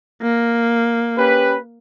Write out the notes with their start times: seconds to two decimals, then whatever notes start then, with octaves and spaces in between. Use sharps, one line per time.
0.22 A#3
1.17 C#4 G4 B4